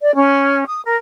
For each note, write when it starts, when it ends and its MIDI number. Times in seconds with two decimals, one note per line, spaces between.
0.01 0.14 74
0.15 0.64 61
0.67 0.81 87
0.85 0.97 70